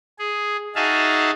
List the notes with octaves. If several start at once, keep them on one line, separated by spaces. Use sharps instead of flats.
G#4
D#4 F#4 G#4 E5 F5 A5